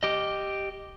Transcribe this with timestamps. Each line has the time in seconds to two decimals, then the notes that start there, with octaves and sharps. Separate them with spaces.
0.03 G4 D#5